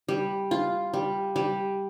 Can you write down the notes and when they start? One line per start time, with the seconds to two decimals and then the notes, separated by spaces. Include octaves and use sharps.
0.09 G3
0.51 F4
0.93 G3
1.36 G3